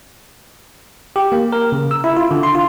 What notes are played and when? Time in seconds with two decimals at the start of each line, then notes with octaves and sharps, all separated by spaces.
1.16 G4
1.32 A#3
1.52 A#4
1.72 C#3
1.91 E6
2.04 E4
2.16 F4
2.31 D3
2.43 C6
2.55 F4